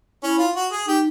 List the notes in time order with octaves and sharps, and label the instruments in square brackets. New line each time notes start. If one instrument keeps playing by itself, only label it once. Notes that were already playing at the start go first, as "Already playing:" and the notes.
[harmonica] C#4 [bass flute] E4
[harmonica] F4
F#4
G#4
[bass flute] D#4 [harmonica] G4